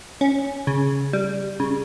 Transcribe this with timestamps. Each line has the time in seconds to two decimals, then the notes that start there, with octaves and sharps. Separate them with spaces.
0.21 C#4
0.67 C#3
1.13 G3
1.60 C#3